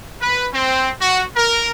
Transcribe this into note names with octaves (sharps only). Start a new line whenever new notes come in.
B4
C4
F#4
A#4